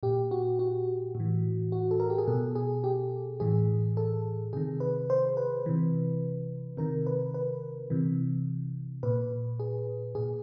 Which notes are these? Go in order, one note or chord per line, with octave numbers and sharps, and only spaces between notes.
A#2 G4
F#4
F#4
A2 E3
F#4
A4
A#4
G4
G#4
B2 A4
G#4
G4
A2 E3 G#4
A4
C3 D#3 G#4
B4
C5
B4
C3 E3
C3 D#3 A#4
B4
B4
C3 E3
A#2 B4
G#4
A#2 G#4